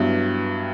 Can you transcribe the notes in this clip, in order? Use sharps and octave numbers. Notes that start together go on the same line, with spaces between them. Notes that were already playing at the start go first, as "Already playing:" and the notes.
Already playing: G2 F#3 B3 E4 G4